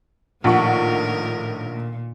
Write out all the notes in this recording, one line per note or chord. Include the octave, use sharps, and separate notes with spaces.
A#1 A2 D#3 A#4 F#5 C#6
A#2